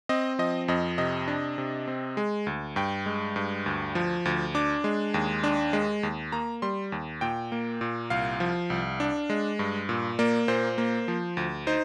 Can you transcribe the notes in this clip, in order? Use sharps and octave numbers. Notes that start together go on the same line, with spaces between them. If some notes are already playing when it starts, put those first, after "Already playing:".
C4 D#5
F3 D#5
F2 D#5
C3 D#5
D4
C3
C4
G#3
D2
G2 G5
G#3
G2
D2
F3
D2
D4 D6
G#3
D#2
D4
G#3
D#2
A#3 A#5
G3 C6
D#2
A#2 G5
A#3
A#2
C2 F5
F3
C2
D4
G#3
G2
A#2
A#3 D5
A#2 C5
A#3
F3
D2
D#4 C5